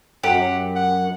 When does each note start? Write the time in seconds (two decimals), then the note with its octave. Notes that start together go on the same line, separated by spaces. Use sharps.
0.23 F#2 G4 F#5
0.75 F#5